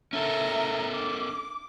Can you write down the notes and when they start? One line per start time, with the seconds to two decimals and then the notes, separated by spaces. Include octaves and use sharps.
0.13 C#4 A4 A#4 E5 A#5
0.93 D6